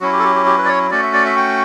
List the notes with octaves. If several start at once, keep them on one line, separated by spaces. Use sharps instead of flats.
F#3 C#4 E4 F#4
G4
A4
G4
G4
G4
B4
D5
C#5
A3 C#4 F#4 D5
E5
D5
E5
G5